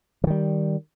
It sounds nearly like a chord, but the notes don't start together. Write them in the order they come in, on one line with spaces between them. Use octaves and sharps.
E3 D#3 G3